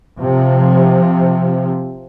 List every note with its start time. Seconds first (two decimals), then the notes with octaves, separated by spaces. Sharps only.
0.18 C3 F3